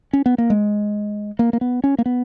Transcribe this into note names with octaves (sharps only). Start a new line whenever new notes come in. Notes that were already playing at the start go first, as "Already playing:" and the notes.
C#4
B3
A#3
G#3
A#3
A#3
B3
C#4
A#3
B3